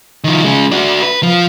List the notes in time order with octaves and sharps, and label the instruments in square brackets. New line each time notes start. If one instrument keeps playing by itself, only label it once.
[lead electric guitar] D#3 F3
C#3 G#3
D4 F#4
B4
F3